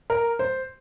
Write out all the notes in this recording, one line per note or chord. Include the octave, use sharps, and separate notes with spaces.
A#4
C5